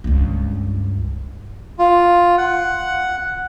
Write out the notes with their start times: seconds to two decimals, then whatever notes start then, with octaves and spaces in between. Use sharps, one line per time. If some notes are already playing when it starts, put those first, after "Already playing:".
0.04 C#2 G2
1.79 F4
2.38 F#5